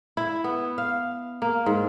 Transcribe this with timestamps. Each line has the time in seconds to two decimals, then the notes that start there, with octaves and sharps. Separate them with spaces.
0.17 E4
0.44 B3
0.78 F5
1.42 A#3
1.66 G#2